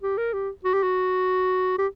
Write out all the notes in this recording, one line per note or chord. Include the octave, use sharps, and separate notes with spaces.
G4
A#4
G4
F#4
G4
F#4
G4